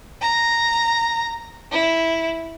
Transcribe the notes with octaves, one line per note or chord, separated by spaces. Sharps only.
A#5
E4